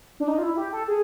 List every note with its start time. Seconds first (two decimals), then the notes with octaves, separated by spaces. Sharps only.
0.20 D4
0.28 D#4
0.38 F4
0.43 E4
0.57 G4
0.73 A4
0.88 G#4